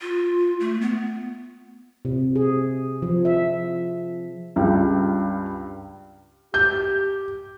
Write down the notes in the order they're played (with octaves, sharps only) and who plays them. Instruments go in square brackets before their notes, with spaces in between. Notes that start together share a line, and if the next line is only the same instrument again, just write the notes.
[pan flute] F4
A3
B3
[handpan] C3
G#4
F3
E5
[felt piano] C#2 G2 F4 G5
[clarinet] G4 [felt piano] G6